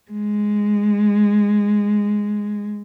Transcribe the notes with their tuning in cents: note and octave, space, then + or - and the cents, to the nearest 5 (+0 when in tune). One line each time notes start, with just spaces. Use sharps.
G#3 -5